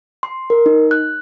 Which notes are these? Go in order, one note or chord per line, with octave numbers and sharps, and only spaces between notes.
C6
A#4
D#4
F#6